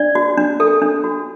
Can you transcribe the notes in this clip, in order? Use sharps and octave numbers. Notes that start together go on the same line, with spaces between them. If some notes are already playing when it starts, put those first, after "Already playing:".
Already playing: D4 D5
F#4
D4
A4
D4
F#4